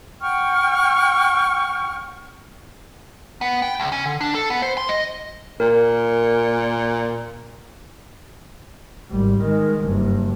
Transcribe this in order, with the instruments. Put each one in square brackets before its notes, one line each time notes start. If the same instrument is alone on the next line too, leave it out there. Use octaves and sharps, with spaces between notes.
[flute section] F#5 G5 C#6 F6
[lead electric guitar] B3
G5
C#2
C#4
D3
D4
A4
B3
C5
C6
D#5
[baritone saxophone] A#2 [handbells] A#4
[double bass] G#1 G3
D#3 G#3
F#1 G2